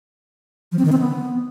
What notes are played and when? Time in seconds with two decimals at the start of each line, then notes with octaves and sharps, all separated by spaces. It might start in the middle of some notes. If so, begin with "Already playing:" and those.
0.72 F3
0.79 C4
0.85 D#3
0.92 C4
0.99 B3